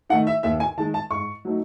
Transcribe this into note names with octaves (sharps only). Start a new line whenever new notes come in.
D#3 A3 D#4 F#5
E5
D#2 E5
G#5
D#3 G#3 A5
A5
G#2 C#6
F#3 A3 D#4